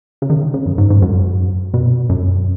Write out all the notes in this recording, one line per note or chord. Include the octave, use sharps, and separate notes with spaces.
C#3
D#3
C#3
F#2
G#2
G#2
F#2
B2
F#2